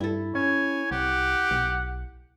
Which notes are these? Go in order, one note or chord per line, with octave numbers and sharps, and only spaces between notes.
G2 E4 A4
C#4 C#5 G#5
C2 G4 F#5
B1